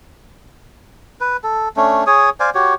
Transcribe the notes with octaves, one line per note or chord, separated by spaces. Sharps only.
B4
A4
A3 C#4 D4
G#4 C#5 D#6
C5 D5 F5 G#5
F#4 G4 C#5